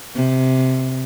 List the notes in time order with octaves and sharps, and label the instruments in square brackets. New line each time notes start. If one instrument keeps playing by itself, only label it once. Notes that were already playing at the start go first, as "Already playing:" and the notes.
[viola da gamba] C3